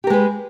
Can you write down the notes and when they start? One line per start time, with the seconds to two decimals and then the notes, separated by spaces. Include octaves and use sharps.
0.04 G4
0.07 A#4
0.10 G#3
0.13 B4